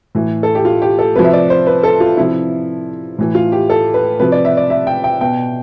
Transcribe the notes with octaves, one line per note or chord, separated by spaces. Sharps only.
A2 E3
A4
G4
F4
G4
A4
C3 F3 B4
E5
D5
C5
B4
A4
F4
C3 F3 E4
A2 E3
F4
G4
A4
B4
C3 F3 B4
D5
E5
D5
E5
G5
G5
B2 G5